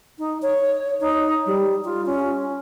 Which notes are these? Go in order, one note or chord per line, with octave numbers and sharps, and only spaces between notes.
D#4
C#5
D#4
G3
F4
C#4